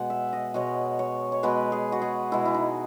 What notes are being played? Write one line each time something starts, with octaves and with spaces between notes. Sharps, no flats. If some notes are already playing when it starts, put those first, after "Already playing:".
Already playing: B2 G#3 F#5
E5
D#5
B2 G#3 C#5
C#5
C#5
B2 G#3 B4
G#4
F#4
G#4
B2 G#3 E4
E4
D#4